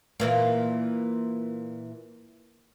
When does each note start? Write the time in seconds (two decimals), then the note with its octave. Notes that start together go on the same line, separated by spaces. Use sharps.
0.20 A#2 E3 A#3